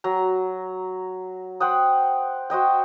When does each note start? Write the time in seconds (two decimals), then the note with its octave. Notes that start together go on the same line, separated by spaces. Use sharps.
0.04 F#3 A#5
1.60 C5 F#5 G5 D#6
2.50 F#4 C5 D#5 G5